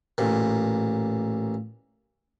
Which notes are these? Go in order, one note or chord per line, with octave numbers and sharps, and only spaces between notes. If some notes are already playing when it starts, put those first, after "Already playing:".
A1 A#2